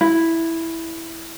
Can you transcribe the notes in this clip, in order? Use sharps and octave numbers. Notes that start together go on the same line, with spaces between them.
E4